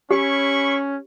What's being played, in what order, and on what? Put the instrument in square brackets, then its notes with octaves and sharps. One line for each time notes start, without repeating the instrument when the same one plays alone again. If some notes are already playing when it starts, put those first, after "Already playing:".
[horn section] C#4 [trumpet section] E4 B5 C#6 [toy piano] G4